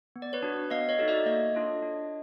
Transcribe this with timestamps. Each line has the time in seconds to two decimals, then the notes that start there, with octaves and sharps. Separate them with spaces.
0.16 B3
0.22 D5
0.33 B4 C#5
0.43 D4 F#4
0.70 B3 D#5 F5
0.89 C#5 D#5
0.99 D#4 F#4 A4
1.08 D5 E5
1.26 A#3 C#5 D#5
1.55 D4 F4 A4
1.82 D4